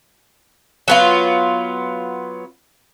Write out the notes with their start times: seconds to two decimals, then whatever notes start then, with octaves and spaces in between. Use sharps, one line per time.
0.88 F#3 B3 F4